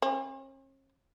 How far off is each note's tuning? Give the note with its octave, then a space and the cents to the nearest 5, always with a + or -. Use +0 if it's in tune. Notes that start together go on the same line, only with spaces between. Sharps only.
C#4 -45